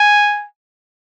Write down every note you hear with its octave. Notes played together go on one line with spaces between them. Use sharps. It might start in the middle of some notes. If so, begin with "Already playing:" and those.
Already playing: G#5